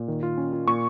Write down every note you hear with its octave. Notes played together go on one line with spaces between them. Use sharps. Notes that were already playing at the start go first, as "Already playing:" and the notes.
Already playing: A#2
D#3
F4
C#4
F4
A#2 C#6